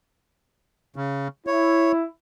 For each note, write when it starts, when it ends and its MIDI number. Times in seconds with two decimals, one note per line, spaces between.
0.96 1.28 49
1.47 2.05 64
1.47 1.92 73